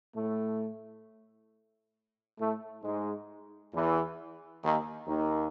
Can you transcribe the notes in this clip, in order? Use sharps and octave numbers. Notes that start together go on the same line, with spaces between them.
A2 A3
A2 A3
G#2 G#3
E2 E3
D#2 D#3
D#2 D#3